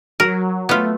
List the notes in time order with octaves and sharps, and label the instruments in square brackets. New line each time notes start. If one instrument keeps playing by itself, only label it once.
[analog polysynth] F#3 [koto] A#4
[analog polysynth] A3 [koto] B3 F4